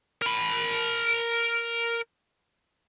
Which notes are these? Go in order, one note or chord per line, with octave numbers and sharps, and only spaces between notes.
A#4 B5